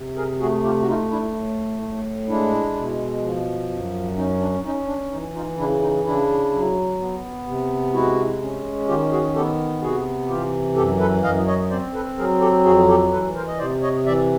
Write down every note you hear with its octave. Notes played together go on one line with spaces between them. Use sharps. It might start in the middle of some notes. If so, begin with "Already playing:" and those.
Already playing: C3
G#4 A#4
A3 F#4 G#4
F4 G4
F#4
A3 D#4 F4
D4 E4
A2
A2
G#3 D4 E4
B2
F3
F#2
C#4 D#4
D4
C#4 D#4
D4
E3 D#4
D#4 F4
C#3 D4 E4
D#4
C#3 D4 E4
F#3
B3
C3
G#3 E4 F#4
C#4
D#3 F4 G4
F#4 G#4
B3 G4 A4
C3 F#4 G#4
E3 F4 G4
F#2 G4 A4
A4 B4
F#2 D#5 F5
C#5 D#5
C4 C5 D5
A4 B4
F#3 G#4 A#4
G4 A4
F2 F#4 G#4
G4 A4
E3 A4 B4
A#4 C5
D#5
C3 C5 D5
C#5 D#5
E3 D5 E5